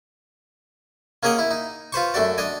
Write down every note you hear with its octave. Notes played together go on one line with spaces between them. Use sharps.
A#3 C#4 G#4 A#4 D#5 F#5
E4
D#4
F4 B4 C5 C#6
F#2 A3 F#4 D5
D4 D#5 G#5